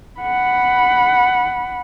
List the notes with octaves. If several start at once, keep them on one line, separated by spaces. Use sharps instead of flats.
F#5 B5